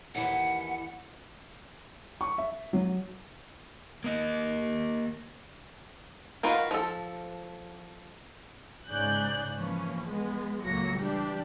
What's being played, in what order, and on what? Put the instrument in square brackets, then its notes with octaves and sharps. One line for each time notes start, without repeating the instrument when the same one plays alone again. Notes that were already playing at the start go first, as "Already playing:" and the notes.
[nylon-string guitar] D#2 E3 [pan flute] F#5
[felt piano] C#6
E5
F#3
[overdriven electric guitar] A#3 D#5
[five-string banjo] D#3 F4 F#4 B4 F5
F3 A4
[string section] G#2 C#3 G#4 D5 F#6 G6
E3 F3 A#3 C#4
G#3 B3
C#2 A2 F#3 A#3 A#6 C#7
E3 G3 D4 G4